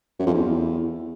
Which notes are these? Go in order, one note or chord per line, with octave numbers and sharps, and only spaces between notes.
F#2
F2
E2